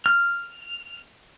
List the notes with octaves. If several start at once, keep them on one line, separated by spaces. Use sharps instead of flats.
F6